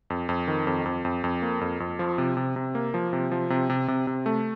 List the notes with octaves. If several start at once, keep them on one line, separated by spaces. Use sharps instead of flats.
F2
F2
D#3
F2
F2
F2
F2
A#3
F2
F2
F3
C3
C3
C3
A#3
F3
C3
F3
C3
C3
C3
C3
A3